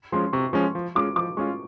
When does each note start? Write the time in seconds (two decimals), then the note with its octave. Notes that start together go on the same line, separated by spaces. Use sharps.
0.12 F3 G#3 C#4 C6
0.33 C3 C#6
0.53 F3 G#3 C#4 C#6
0.75 F3
0.95 G#3 C#4 F4 D6
1.16 F3 D6
1.37 G#3 C#4 F4 C#6